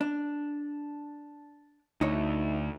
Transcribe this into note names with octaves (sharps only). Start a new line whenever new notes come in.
D4
D2 D#4 E4 C#5